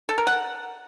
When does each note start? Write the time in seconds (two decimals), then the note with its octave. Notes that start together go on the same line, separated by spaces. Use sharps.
0.09 A4
0.18 A#4
0.27 F#5